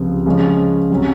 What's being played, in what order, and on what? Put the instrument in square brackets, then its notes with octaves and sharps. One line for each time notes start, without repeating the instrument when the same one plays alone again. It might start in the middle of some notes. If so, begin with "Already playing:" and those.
Already playing: [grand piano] C#2 C3 F3
C#3 F3 G#3 C#4
C3 F#3 C#4